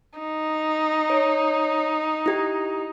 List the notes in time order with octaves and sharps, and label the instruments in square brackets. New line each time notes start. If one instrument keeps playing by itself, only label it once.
[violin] D#4
[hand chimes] C#5
E4 G4